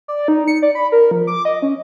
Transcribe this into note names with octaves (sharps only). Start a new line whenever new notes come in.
D5
D#4
C#7
D5
B5
A#4
F3
D6
D#5
C#4